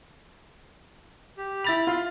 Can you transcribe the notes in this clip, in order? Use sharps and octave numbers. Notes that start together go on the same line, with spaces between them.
G4
E4 B5 A6 F7
F4 C6